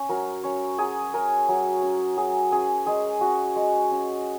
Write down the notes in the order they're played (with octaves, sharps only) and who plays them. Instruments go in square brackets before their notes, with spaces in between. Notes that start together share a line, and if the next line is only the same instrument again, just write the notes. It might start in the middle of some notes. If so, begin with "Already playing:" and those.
Already playing: [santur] C#4 C#5
F#3 A#4
C#4 C#5
F#3 G#4
C#4 A#4
F#3
C#4
F#3 G#4
C#4 G#4
G#3 G#4
C#4 F#4
G#3
C#4